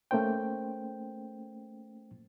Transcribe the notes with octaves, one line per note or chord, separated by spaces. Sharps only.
A3 A#3 C#4 C5 G5